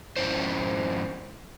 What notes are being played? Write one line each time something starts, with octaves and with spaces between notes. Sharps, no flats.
F2 G#2 D#3 C#4 E4 C5